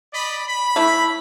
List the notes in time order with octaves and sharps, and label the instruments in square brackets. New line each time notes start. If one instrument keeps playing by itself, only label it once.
[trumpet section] D5 D#5 B5
B5
[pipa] A3 E4